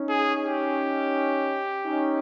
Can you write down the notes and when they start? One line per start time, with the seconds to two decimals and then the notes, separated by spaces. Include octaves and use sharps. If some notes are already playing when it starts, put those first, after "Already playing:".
Already playing: C#4 D#4
0.09 G#4
0.44 G4
1.85 C#4 D#4